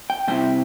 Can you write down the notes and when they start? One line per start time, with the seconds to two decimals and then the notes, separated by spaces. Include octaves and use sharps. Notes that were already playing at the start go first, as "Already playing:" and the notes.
0.10 G5
0.28 C3 G3 C4 E4 G5